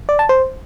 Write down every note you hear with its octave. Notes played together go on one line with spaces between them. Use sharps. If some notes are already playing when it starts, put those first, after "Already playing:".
D5
A5
C5